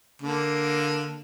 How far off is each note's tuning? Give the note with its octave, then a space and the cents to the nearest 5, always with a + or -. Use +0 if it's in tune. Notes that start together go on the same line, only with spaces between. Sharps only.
D3 +0 A#3 +0